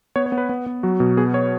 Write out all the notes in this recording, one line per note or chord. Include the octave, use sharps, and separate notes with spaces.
B3 C#5
C#5
B3
B4
B3
B3
F#3 F#4
B2
B3 G#4
C#5